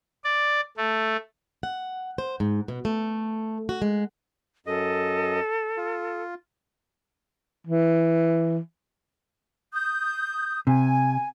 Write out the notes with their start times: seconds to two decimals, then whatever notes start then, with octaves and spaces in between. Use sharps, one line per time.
0.24 D5
0.77 A3
1.63 F#5
2.18 C5
2.40 G#2
2.68 B2
2.85 A3
3.69 F#4
3.82 G#3
4.67 F#2 A4 D#5
5.77 F4
7.67 E3
9.73 D#6 G6
10.67 C3 G#5